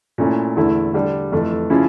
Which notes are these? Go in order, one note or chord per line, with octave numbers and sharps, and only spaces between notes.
A#2 A3 C#4 E4
E2 D3 A3 E4
D3 G3 D4
F2 E3 A3
C#3 F3 C#4 E4